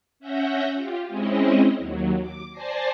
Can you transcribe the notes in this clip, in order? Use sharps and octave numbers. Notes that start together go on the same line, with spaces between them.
C#4 E5 F#5 G6 A#6
F4 G4
G#3 C4 C#4 E4 D#5
D#2 F#3
D6
C5 D5 G#5 A5 A#6 C7